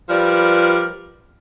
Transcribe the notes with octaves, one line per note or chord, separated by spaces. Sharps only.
F3 G3 A#4 B4 D5